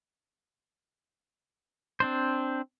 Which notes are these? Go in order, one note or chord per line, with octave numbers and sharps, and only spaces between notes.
C4 D4 C5